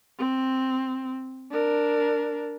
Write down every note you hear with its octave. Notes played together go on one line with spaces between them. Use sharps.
C4
D4 A#4